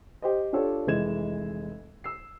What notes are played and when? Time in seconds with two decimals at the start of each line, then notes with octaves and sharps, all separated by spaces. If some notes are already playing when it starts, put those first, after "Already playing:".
0.22 G4 C5 D#5
0.53 D4 F4 G4 A4 C#5 D5
0.87 F1 E3 G#3 G#6 E7
2.04 E6 C7